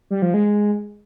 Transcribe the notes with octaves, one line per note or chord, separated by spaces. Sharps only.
G3
F3
G#3